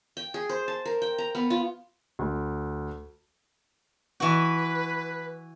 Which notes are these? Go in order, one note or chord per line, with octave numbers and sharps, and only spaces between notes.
G5
G#4
C5
A5
A#4
G5
A#5
B3
F4
D2
E3 F#4 B4